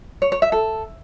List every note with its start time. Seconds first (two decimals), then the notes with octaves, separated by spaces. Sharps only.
0.22 C#5
0.32 C#5
0.42 E5
0.52 A4